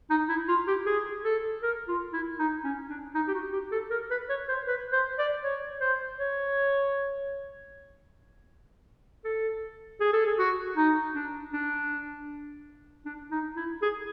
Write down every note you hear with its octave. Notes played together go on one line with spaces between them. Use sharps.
D#4
E4
F4
G4
G#4
A4
A#4
F4
E4
D#4
C#4
D4
D#4
G4
F#4
G4
A4
A#4
B4
C#5
C5
B4
C5
D5
C#5
C5
C#5
A4
G#4
A4
G#4
F#4
D#4
D4
D4
D4
D#4
E4
G#4